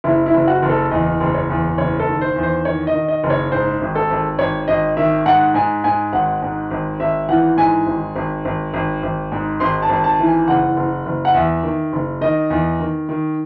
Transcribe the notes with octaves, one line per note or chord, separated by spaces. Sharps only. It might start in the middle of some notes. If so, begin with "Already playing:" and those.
F#1 E4
E4
F#1
F#4
F#1
A4
E2 D#5
F#1
C#5
E2
F#1 C#5
A4
D#3
C5
E2
C5
D#3 C#5
D#5
D#3
D#5
F#1
C#5
G#2 C5
G#1
A4
G#1
G#1 C#5
G#1 D#5
D#3 E5
G#2 F#5
G#2 G#5
G#2 G#5
G#1 F#5
G#2
G#1
G#1 E5
E3 F#5
G#2 G#5
G#1
G#1
G#1
G#1
G#1
G#2
G#1 C6
A5
G#1
A5
E3
G#5
F#1 F#5
F#1
F#1
F#5
E2 E5
D#3
F#1
D#3 D#5
E2
D#3
D#3